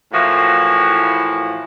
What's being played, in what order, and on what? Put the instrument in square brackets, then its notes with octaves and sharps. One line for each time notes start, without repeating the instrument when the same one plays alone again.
[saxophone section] A2 E3 F3 A#3 F#4